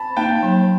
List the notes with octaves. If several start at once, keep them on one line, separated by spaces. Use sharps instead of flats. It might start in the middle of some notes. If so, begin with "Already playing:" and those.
Already playing: A5 B5
A#3 D#4 G5 A5
F#3